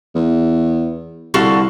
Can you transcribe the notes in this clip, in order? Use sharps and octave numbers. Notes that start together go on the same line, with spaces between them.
E2
C2 D3 F#4 F5